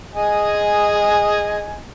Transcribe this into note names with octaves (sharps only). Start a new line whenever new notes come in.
G#4 D#5 G#5